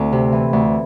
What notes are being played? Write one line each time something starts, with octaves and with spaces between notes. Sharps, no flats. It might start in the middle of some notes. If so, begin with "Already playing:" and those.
Already playing: D2 A3 C4 E4
C3
E3
D2